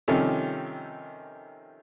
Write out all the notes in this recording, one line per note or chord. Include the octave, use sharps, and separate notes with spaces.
C3 D#3 F3 G3 C#4 A4